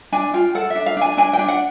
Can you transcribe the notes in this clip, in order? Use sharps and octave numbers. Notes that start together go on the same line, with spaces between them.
D4 G#5
F4 G5
A4 F#5
D4 E5
F5
D4 G#5
D4 G#5
G5
D4
F#5